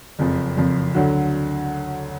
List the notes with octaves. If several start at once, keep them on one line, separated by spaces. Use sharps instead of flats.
F#1 F2 F3
F#1 F2 F3
D2 D3 F#3